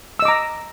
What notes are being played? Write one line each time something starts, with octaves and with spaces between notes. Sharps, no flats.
D#5 A#5 D6 E6